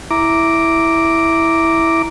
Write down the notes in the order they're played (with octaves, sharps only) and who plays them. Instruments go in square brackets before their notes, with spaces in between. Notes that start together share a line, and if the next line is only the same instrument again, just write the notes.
[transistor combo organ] E4 A#5 D6